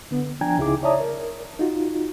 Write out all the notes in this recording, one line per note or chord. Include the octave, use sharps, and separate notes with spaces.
D3 B3
F3 D4 G5 G#5 A#5 G#6
C#2 C#3 D#4 E4 G#4 D6
C#5 D5 E5 A5 A#5 D#6
A#4
D#4 F4 F#4